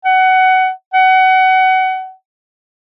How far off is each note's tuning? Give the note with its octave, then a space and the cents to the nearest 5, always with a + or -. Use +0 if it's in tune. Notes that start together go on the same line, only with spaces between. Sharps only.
F#5 +20
F#5 +25